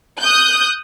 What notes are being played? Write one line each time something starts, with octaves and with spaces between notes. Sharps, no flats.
D#6 F#6 G6